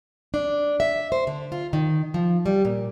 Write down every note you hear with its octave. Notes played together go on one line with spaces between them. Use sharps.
D4
E5
C5
D3
F4
D#3
F3
G3
A#2